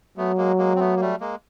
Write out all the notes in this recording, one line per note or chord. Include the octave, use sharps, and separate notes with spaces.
F#3 A3 B3
G#3 A#3
G#3 A#3
C4
A3 B3
A#3
G3 A3
G#3 A#3